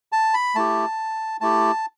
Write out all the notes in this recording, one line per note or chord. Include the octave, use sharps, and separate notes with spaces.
A5
B5
A3 E4 G4 A5
A3 E4 G4 A5